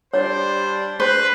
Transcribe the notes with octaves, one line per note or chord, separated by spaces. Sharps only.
G3 D4 C5 C#5
B4 C5